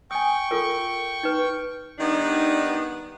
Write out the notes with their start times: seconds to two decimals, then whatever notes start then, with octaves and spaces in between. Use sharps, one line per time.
0.11 G5 G#5 C#6 D#6
0.51 F4 A4 A#4
1.23 D#4 B4
1.99 D#3 G3 B3 D4 D#4